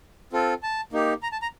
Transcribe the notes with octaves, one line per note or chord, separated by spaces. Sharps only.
C4 F4 A4
A5
A#3 D#4 G4
A#5
A5
A#5